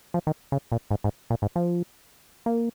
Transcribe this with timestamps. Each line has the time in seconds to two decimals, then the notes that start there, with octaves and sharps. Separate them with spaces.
0.14 F3
0.27 D#3
0.52 C#3
0.72 A#2
0.91 G#2
1.04 G#2
1.30 A#2
1.42 G#2
1.56 F3
2.46 A#3